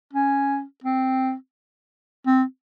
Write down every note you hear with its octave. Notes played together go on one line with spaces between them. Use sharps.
C#4
C4
C4